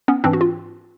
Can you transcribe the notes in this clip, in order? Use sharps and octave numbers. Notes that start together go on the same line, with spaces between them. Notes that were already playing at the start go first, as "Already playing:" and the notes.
B3 C#4
G#2 E3 C4 D4
F#4
F4